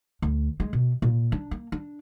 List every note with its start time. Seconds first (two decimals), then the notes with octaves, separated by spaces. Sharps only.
0.22 D2
0.60 G#3
0.73 B2
1.02 A#2
1.32 D4
1.51 A#3
1.72 D4